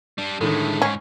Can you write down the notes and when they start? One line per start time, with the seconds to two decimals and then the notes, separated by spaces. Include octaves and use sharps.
0.18 G3 D4
0.41 A2 D3 D#3 G#3 A3
0.82 G#2 C#4